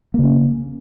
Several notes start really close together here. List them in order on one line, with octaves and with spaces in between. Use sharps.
A#3 C#3 C#4